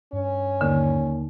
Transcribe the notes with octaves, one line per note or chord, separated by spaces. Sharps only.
G2 C#4
D#2 D3